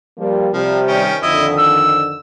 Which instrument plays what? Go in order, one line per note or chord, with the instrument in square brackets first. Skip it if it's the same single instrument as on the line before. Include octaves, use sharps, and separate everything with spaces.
[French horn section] F3 G3 A#3
[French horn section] C3 G3 [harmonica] F3
[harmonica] D#3 C#4 G5
[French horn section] F2 D3 D#3 [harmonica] E4 D#5
[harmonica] E6